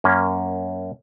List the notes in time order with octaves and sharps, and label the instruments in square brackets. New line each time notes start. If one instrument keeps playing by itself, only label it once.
[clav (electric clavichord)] F#2 A#3 C#4